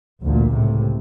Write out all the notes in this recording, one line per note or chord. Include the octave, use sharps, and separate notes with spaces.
A1 D2 A#2
C#2 A2 C3